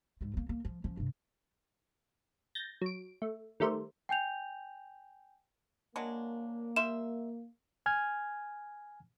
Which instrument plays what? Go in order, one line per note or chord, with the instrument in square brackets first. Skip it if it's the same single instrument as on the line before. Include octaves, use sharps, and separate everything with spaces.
[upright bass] G#2 A3
A3 A#3
A#3
F3
F3 C#4
G2 C3
[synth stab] G6 A6 A#6
F#3 D7
A3
D#3 G3 A3 A#4 C5
[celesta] G5 G#5 G6 F7
[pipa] F#3 G#3 D4 [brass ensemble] A#3
[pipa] G3 E5 C6 [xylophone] E7
[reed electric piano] G#5 F6 G#6